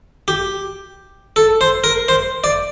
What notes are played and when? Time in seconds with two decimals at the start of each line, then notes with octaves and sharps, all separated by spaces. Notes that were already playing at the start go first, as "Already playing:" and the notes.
0.28 G4
1.36 A4
1.61 C5
1.84 A#4
2.08 C5
2.44 D5